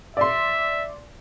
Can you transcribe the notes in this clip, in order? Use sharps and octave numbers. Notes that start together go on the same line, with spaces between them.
D5 E5 C6